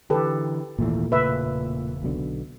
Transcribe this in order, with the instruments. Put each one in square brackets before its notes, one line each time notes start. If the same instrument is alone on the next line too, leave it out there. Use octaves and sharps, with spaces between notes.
[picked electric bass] D3 E3 [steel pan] G4 A4 B4
[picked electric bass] G#1 D#2 E3 [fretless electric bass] A#2 A3
[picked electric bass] E1 C#3 A#3 [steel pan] B4 E5
[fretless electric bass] B1 B2 D3